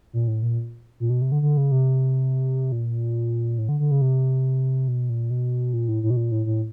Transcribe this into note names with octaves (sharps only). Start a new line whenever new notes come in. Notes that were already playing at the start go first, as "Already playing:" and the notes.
A#2
A2
A#2
A#2
B2
C3
D3
D3
C#3
C3
A#2
A2
D3
D3
C#3
C3
B2
A#2
B2
A#2
A2
A2
B2
A#2
A2
A2